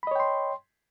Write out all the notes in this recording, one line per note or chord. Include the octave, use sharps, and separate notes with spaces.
C#5 D#5 G5 B5 C6